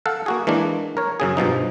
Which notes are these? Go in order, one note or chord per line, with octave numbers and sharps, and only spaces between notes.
A4 F5 F#5
A#3 F#4 G#4
E3 G#3 A#3 D4
A#4 C#5
F#2 C#3 G#4
G2 B2 F3 D#4